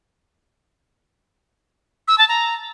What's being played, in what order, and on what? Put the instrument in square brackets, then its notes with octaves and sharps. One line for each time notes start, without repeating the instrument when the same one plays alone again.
[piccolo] E6
A5
A#5